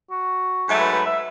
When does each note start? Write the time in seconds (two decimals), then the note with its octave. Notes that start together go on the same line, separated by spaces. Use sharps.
0.11 F#4
0.65 G#2 F#3 A3
0.79 B4
0.92 B4
1.06 E5